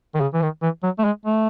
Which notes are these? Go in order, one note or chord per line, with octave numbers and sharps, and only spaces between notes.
D#3
C#3
E3
D#3
E3
F#3
A3
G#3
A3